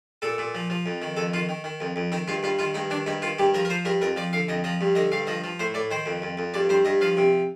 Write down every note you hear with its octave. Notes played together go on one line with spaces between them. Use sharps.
A#2 A4
A#2
F3
F3
F2
D#3
F2 A4
D#3 F4
D#3
D#3
F2
F2
D#3 D#4
G2 F4
G2 F4
D#3 F4
G2 D#4
D#3 D4
G2 D#4
D#3 F4
G2 G4
F3 A#4
A#4
F3 C5
G2 A#4
F2 A#4
F3 D5
D3 F5
F2 D#5
F3 D#5
G2
D3 D#5
G2 F5
F3 D#5
F3
A2 C5
A2 D5
D#3 C5
F2
F2
F2
G2 D5
G2 C5
G2 D#5
F3 F5
C3